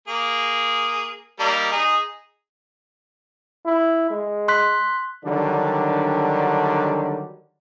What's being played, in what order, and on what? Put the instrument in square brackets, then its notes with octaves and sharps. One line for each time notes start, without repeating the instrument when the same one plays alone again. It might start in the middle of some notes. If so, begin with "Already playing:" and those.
[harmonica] A#3 G#4
G3 A#3 D#4
D#4 G#4
[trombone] E4
G#3
[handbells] C6 F#6 B6
[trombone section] D3 D#3 F#3 G3 D4